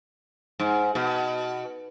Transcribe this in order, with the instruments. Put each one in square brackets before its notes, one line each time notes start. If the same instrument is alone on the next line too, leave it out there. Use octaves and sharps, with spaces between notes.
[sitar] G#2
B2